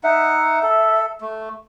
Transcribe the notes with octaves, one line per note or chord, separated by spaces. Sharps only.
D#4 E5 F#5
A4
A3